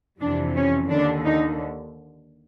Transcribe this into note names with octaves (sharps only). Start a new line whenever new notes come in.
F2 C3 E3 D4
C#4
D#2 D3 D4
D#4